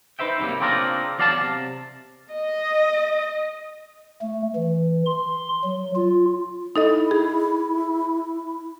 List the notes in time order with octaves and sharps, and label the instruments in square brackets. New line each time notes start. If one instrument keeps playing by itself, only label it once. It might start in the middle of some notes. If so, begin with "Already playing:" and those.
[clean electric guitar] D#4 B4 C5 E5 G5
F#2 C3 E3 G3 A#3
C#3 A#3 C4 D4 F4 A#4
E2 F#3 D5 F5 G#5 A5
C3
[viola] D#5
[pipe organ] A3
E3
C6
F#3
F4
[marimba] D#4 A4 D#5 [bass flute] E4
[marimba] G#4